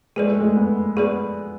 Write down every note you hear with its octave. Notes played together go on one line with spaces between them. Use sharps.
G#3 G#4 B4 D5
A3
G#3
B3
B3 G#4 B4 D5